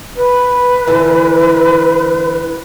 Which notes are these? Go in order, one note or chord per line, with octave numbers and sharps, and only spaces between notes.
B4
D3 E3